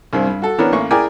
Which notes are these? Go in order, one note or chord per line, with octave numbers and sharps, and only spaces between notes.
C2 G2 C4
G2
F#4 A4
E3 B3 C#4 D4 A#4
A1 A#3 C#6
E4 G#4 A#4 D5 G5 G#5